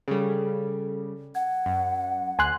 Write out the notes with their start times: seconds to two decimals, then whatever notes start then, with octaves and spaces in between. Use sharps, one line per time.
0.08 C#3 G3 G#4 A4
1.35 F#5 G#6
1.66 F#2
2.39 D2 G#5 C6 F#6